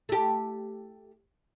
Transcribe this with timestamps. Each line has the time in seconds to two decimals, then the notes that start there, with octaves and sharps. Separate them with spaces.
0.09 A3 G4